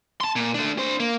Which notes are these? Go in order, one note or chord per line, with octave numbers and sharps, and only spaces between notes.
A5 C6
A#2
A3 D4
D4 C5
A#3